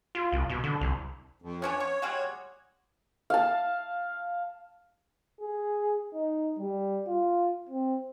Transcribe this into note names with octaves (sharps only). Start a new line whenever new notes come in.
F4
C2
B2
D3
C2
F2
B3 C#4 D4 C#5
C#6
G3 G#3 F#4
F5 A5
G#4
D#4
G3
F4
C4